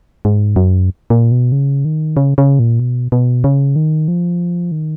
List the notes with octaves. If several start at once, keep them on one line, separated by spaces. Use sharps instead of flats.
G#2
F#2
A#2
B2
C#3
D#3
C#3
C#3
A#2
B2
B2
C#3
D#3
F3
D#3